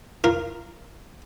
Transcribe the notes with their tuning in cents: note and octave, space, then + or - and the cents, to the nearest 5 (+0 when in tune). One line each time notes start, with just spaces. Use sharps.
F4 -25 A#4 +0